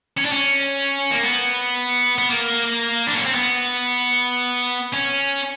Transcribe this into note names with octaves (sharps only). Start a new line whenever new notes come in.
C#4
D4
C#4
A#3
B3
B3
A#3
D4
C#4
C4
B3
C#4